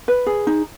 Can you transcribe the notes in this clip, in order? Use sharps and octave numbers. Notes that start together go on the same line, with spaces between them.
B4
G#4
D#4